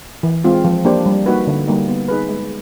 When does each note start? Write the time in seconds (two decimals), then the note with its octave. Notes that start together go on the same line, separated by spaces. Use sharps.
0.23 E3
0.44 G#3 C4 F4
0.65 F3
0.85 A#3 D4 G4 C5
1.06 G3
1.26 A#3 D#4 F#4 B4
1.47 D3
1.67 G3 A#3 D#4
1.88 B3
2.08 D#4 G#4 B4
2.29 G#3